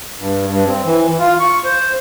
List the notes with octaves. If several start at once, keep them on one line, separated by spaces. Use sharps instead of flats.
G2
G2
C4
E3
F4
C#6
C5